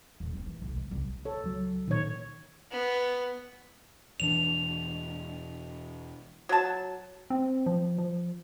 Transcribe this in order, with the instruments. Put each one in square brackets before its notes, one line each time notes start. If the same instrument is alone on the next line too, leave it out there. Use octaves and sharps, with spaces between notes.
[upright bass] D#1
C4
E3
B1
C#2
C2
[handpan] A4 [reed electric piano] C#5
[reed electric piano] C#2 F#3
[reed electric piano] A#2 D#4 G#6 [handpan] D#3 C#5
[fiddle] B3
[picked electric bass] E1 E3 D4 [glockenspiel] F7
[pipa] F#3 A5
[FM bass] C4
F3
F3